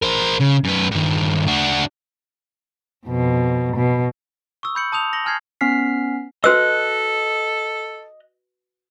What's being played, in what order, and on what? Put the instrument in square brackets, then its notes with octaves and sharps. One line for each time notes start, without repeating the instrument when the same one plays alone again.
[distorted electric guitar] A#4 C5
C#3
F#2 B4
G2 D#3
D4 F#4
[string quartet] F2 B2
B2
[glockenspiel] C#6 D#6 E6
B5 G6 C#7 F#7
A5 D#6 G6 F7
A#6 C#7 F#7 G7
G#5 A5 F6 G6 G#6 C7
[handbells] B3 C#4 F6 B6 C7
[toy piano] F#4 B4 E6 [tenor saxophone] A4 [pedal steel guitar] D#5 F#6